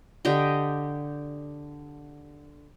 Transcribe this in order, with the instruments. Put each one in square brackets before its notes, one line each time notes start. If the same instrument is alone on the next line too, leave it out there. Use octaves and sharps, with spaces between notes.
[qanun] D3 G4 D#5 G5